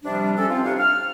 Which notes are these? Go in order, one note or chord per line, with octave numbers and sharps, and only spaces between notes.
C3 F3 G3 D4
C3 C#4 A4
F3 C4 F4
C3 G3 D4 D#4 C#5 F5
F6